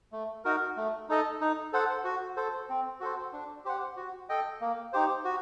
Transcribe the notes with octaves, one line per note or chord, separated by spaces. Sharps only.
A3
D#4 F#4 A#4
A3
D#4 A4 D#5
D#4
A4 C5 F#5
F#4
A4 C5
C4
F#4 A4 C5
D4
G4 C5 F#5
F#4
A4 D#5 G5
A#3
D#4 G4 C5
F#4